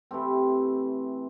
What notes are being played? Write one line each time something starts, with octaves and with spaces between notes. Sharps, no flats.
C3 E3 A3 C4